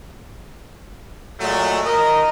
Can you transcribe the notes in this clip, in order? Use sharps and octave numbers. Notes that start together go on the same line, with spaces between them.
A#2 F#3 G#3 A3
A#4 D#5